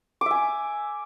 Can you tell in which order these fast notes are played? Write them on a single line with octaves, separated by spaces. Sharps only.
D6 E5 G#5